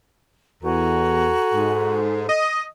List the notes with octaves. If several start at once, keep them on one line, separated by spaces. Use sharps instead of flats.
E2 F#4 A4 G#5 A#5
G#2
D#5